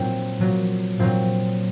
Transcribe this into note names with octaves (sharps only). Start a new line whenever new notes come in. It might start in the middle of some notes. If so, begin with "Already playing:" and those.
Already playing: A#2 F#3 C4
A#2 F#3
A#2 F#3 C4